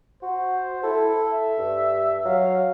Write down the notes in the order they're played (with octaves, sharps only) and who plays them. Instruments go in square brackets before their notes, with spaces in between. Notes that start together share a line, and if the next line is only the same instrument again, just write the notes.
[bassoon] F#4 [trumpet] C5
[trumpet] E4 [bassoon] A4
[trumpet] E5
[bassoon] G2
[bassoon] F#3 [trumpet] F5